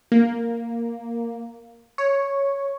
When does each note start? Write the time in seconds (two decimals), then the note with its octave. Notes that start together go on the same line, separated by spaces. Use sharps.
0.12 A#3
1.98 C#5